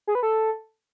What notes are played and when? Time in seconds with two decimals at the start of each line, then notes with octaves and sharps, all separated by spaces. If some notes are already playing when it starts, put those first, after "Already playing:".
0.07 G#4
0.15 B4
0.23 A4